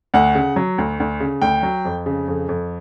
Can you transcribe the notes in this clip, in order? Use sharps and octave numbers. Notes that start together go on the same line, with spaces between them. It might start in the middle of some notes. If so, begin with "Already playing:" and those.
D2 F#5
C#3
F#3
D2
D2
C#3
D2 G5
F#3
F2
C#3
F2
F2